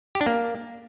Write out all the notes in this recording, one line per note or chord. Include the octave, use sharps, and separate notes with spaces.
G4
D4
A#3